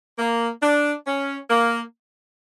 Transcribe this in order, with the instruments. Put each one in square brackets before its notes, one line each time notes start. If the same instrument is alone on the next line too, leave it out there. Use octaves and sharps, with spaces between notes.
[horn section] A#3
D4
C#4
A#3